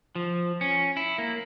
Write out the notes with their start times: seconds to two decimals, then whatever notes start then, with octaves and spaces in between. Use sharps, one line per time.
0.15 F3
0.61 C#4
0.97 E4
1.18 A#3